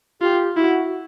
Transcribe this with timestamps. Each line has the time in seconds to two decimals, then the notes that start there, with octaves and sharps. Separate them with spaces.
0.22 F4 G4
0.57 E4 F#4